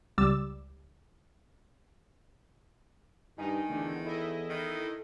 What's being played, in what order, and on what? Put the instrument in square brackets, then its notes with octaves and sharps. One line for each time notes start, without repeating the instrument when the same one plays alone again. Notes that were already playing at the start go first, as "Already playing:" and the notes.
[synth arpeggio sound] C#2 G3 D5 E6 A6
[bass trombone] G2 [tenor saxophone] D#3 [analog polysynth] D#4 [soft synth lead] G#5
[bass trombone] E2 [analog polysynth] D3 A3
[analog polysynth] E4 D#5 [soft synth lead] A4
[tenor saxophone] D#3